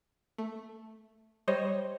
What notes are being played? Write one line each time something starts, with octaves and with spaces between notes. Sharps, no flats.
A3
G3 C5 C#5 D#5